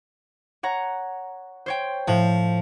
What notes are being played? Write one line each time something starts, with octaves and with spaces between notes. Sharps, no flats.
C#5 F#5 A#5
C5 C#5 G5
A2 F3